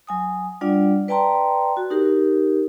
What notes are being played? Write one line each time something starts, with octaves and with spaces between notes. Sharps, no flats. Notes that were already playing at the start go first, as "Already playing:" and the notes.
F#3 G#5 D#6
G3 D4 F4 D5 F#5
B4 D5 G5 A5 A#5 C6
F#4
D#4 G4 A#4